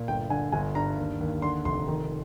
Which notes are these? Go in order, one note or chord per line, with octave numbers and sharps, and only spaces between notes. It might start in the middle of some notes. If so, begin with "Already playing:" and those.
Already playing: A#2
G1 G5
D3 G#5
G1 G#5
G2 A#5
D#2
D#2
D3 C6
F1 C6
D#3